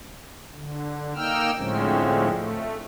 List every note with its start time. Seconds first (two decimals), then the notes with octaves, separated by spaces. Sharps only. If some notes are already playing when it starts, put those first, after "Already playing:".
0.54 D3
1.16 A#3 D#4 G5 E6 F6
1.57 A2 D3 F3 G#3 C4 C#4
2.32 A3